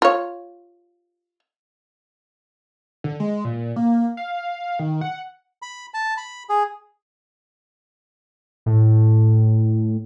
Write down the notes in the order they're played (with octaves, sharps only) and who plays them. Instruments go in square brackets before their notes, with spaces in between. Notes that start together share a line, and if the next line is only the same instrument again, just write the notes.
[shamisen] F4 C#5
[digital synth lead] D3
G#3
A#2
A#3
F5
D#3
F#5
[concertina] B5
A5
B5
G#4
[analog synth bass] A2